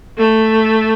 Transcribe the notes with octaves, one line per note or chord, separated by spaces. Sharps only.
A3